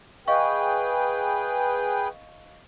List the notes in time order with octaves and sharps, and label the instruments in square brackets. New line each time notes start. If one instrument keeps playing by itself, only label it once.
[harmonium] G#4 B4 G5 [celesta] D#5 F5 C#6